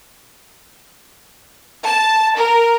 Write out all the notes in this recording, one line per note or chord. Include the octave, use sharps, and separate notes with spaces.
A5
A#4